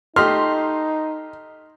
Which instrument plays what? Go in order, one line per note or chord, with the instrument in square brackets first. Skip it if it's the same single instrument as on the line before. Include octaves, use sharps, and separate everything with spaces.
[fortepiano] A3 G4 D#5 [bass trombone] D#4 [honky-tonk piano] C6 [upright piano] F6